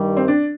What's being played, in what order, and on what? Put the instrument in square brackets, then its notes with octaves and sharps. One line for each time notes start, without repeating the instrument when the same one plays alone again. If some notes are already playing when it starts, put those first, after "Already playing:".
Already playing: [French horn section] G2 D#3 G3
[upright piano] C4
D4